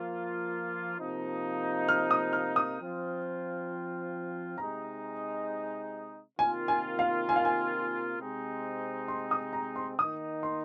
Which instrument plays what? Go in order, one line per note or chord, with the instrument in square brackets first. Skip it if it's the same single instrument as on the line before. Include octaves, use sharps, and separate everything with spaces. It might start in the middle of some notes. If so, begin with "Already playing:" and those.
Already playing: [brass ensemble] F3 A#3 F4
C3 F3 A#3 D#4
[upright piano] F6
D#6
F6
D#6
[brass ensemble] F3 C4 F4
[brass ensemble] C3 G#3 D#4 [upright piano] A#5
[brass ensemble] C3 D#3 A#3 F4 [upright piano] G#5
[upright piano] G#5
F5
G#5
F5
G#5
[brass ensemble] C3 G#3 C4 D#4
[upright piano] C6
D#6
A#5
C6
[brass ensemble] D#3 A#3 D#4 [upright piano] D#6
[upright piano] C6